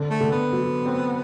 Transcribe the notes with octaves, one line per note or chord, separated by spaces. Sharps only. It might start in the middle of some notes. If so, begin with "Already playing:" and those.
Already playing: D3 C4
A3
D3
B3
F#3
C4